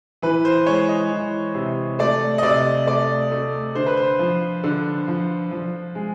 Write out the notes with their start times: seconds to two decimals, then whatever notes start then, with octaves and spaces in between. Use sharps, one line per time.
0.22 E3 B4
0.45 C5
0.66 G#3 C#5
0.88 D#5
1.11 E3
1.55 C3
1.99 A3 D5
2.38 D#5
2.43 C3 D5
2.87 A3 D5
3.32 A3
3.75 D3 C5
3.86 B4
3.97 C5
4.19 F3
4.64 D3
5.07 F3
5.51 F3
5.95 G#3